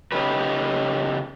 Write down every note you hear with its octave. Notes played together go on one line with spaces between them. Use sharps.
C#3 D#4 E4 G4 B4